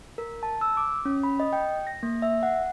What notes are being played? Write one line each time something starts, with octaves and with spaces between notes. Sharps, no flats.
A#4
A5
E6
D6
C#4
B5
D#5
G5
A#6
A#3
E5
F#5